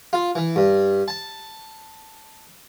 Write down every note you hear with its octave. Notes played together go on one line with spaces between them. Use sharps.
F4
E3
G2
A5